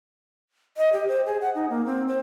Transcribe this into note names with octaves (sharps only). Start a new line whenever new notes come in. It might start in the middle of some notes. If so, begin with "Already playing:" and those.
D#5
G4
C5
G#4
F#5
D#4
A#3
C4
C5